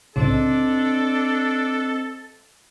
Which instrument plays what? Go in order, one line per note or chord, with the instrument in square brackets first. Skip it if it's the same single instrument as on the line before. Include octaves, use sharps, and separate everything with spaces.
[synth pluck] C2 A2 C#3 [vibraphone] C4 C5 D#5 [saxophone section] D4 [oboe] A4